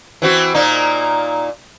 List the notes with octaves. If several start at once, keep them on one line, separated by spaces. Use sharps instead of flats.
E3 C4 F#4
A#2 A#3 D#4